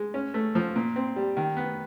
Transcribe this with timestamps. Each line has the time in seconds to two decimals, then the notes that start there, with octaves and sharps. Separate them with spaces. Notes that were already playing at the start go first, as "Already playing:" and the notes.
Already playing: G#3
0.14 C#4
0.34 A3
0.55 F3
0.75 A#2
0.96 C4
1.16 G3
1.37 D#3
1.57 B3